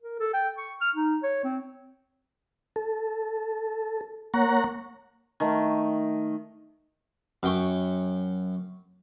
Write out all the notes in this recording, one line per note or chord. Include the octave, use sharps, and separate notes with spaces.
A#4
A4
G5
C#6
F6
D#4
C#5
C4
A4
A#3 C#5 F#5 A#5
D#3 A3
F#2 G5 C#6